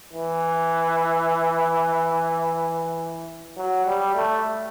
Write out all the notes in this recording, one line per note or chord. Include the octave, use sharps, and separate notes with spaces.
E3
F#3
G3
A3